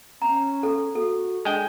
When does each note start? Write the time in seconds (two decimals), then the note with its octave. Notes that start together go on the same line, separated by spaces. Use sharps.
0.22 C#4 A#5
0.63 A4
0.95 F#4 A4
1.45 G#3 D4 G5